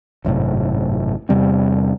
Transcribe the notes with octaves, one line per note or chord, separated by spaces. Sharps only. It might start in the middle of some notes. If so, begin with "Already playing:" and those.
G#1 F#2 A2 C3
E2 C3 G3 C4